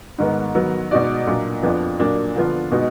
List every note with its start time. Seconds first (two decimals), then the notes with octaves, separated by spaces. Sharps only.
0.18 G#2 D#3 G#3 B3
0.55 D#3 F#3 B3
0.91 B2 G#3 D#4 F#4 D5
1.27 A#2 F#3 A#3 D4
1.63 F2 F3 B3 D4
2.00 A#2 F#3 A#3 D4
2.35 D3 F3 B3 D4 F4
2.71 B2 G#3 B3 D#4 F#4